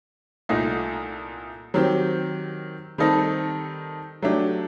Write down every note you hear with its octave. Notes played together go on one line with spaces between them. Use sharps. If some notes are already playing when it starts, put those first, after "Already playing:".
C2 A#2 A3 D#4
D#3 F#3 C4 G4
D#3 G3 C4 D#4 A4
F#3 A3 D4 G4